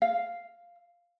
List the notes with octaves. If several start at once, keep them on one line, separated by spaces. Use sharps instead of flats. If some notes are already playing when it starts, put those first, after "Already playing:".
F5